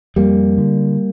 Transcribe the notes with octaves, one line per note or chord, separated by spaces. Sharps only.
F2 G3 A#3
D3